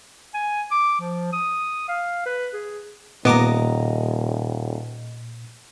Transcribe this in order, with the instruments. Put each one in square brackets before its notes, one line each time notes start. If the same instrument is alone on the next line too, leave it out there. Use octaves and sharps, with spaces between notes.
[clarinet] G#5
D6
F3
D#6
F5
B4
G#4
[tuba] D#1 [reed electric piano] A#2 [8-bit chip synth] B3 D6 [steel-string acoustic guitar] D#5 A5 A#5